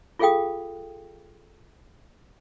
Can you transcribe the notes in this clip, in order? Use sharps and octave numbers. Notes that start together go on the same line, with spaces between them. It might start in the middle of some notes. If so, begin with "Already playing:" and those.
F4 G#4 A4 F5 G5 D#6